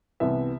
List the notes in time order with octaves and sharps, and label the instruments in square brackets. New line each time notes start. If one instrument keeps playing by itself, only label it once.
[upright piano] C2 C3 E3 B3 E5